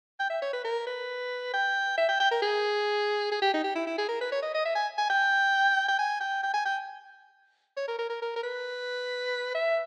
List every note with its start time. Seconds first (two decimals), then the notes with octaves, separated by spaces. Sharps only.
0.20 G5
0.30 E5
0.42 C#5
0.53 B4
0.65 A#4
0.87 B4
1.54 G5
1.98 E5
2.09 G5
2.20 G5
2.31 A#4
2.42 G#4
3.31 G#4
3.42 G4
3.54 D#4
3.64 G4
3.75 E4
3.87 E4
3.98 G#4
4.09 A#4
4.21 B4
4.32 C#5
4.42 D#5
4.54 D#5
4.65 E5
4.75 G#5
4.98 G#5
5.10 G5
5.88 G5
5.98 G#5
6.20 G5
6.43 G5
6.54 G#5
6.65 G5
7.77 C#5
7.88 A#4
7.99 A#4
8.10 A#4
8.22 A#4
8.36 A#4
8.43 B4
9.55 E5